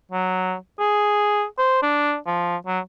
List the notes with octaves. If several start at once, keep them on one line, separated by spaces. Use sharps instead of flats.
F#3
G#4
C5
D4
F3
F#3